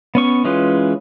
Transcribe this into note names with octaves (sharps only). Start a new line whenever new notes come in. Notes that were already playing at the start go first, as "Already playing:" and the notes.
B3 C#4 C#6
E3 G#3 C#4 F4 B4